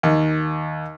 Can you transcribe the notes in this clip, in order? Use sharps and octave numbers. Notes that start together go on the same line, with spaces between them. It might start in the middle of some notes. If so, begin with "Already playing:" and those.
D#2